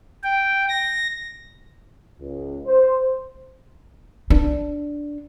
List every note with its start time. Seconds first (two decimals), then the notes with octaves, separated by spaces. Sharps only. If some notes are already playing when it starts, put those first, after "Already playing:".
0.23 G5
0.69 A#6
2.20 C#2
2.66 C5
4.30 D4